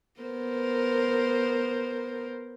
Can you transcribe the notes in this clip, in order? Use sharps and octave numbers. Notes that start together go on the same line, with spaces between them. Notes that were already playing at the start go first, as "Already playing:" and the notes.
B3 A#4 C5